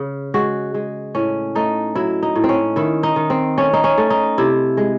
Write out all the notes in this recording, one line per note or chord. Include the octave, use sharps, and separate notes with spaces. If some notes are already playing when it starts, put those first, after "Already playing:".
Already playing: C#3
G#3 F#4
G#3
A2 C#4
A3 D#4
F#3 E4
D#4
A2
C4
C#4
D#3 E4
D#4
D#3
C4
A3 C#4
D#4
C#4
A3
D#4
C3 E4
G#3